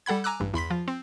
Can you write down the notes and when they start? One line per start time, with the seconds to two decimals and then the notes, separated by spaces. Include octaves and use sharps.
0.06 G3 A4 F#5 B5 G#6
0.24 G#5 A#5 D6 E6 F#6
0.40 A1 G2
0.54 E2 B5 C6 B6
0.70 F3 F4
0.88 C4